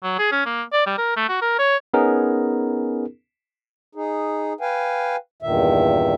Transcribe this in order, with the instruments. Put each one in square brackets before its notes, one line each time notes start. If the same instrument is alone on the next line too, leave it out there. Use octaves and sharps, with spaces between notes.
[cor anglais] F#3
G#4
C#4
A#3
D5
G3
A#4
A3
F#4
A#4
C#5
[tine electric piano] B3 C#4 D#4 G#4 A#4
[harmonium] D#4 G#4
B4 F5 G5 G#5
E2 G2 A#2 D#3 E5